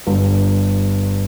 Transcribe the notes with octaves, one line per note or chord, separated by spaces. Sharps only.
G1